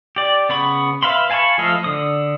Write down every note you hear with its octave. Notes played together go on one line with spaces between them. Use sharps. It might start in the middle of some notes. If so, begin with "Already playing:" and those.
G4 D5
C#3 B3 B5 C#6
B4 E5 F5 B5 C6
F5 G#5 A5 B5 C#6
F3 A3 A4 D#5 F5
D3 D#6